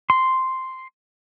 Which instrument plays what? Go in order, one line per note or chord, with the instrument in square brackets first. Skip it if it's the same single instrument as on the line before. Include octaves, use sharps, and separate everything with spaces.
[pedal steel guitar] C6